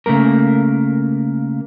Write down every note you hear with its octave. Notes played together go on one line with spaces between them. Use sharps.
C#3 A3 A#3 A#4